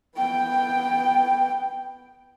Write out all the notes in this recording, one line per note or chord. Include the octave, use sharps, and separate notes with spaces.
B3 G5